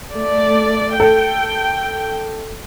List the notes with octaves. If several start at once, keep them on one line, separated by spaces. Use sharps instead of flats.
A3 D5
A4 G5